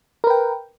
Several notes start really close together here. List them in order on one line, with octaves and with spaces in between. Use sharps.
A#4 B4 G5